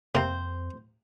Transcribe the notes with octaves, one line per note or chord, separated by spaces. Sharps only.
F2 C3 A#3 C4 C5